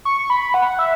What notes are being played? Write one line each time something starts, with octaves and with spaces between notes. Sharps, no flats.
C#6
B5
F#5
E5